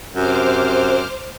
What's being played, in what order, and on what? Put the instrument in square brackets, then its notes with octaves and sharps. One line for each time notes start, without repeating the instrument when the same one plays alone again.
[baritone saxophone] F#2 [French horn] C3 [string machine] C5 D6 F6